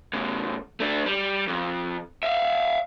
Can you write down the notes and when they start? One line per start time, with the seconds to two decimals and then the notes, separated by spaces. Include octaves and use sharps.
0.13 A2 C#3
0.80 A3 D4
1.06 G3
1.47 F2
2.23 E5 F5